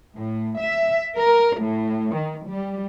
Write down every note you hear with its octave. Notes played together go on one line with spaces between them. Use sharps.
A2
E5
A#4
A2
D#3
G3